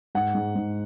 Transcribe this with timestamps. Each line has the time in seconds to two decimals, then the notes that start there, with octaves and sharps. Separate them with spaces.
0.15 G#2 F#5
0.35 G#2
0.55 G#2